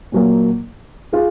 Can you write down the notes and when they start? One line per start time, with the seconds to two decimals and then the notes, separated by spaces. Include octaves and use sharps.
0.12 A#2 F#3 A#3
1.13 F4 G#4